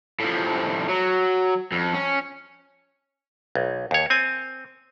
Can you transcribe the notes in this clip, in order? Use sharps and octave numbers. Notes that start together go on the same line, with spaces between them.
A2 F3
F#3
F2
C#4
B1
D#2 C#5
C4 G#5